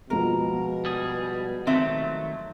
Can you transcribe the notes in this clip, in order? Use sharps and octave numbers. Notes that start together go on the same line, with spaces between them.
B2 F3 G#3 A#4
G3 G#4
D#3 F#3 A3 C4 E5